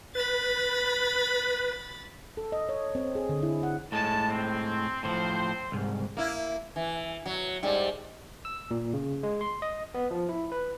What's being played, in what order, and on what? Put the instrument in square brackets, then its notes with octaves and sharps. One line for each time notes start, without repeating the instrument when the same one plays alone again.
[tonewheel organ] B4 [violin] B5 A6
[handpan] A4
D#5
C#5
C4
G#4
D3
E4
F#5
[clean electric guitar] A2 G#3 [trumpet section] A5
[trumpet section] C4
[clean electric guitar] A2 E3 F3 [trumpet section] C4 C5
[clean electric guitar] C2 G#2
[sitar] A#3 E4
E3
F#3
G#2 G3
[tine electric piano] E6
A#2
C#3
G#3
C6
D#5
B3
F3
E4
B4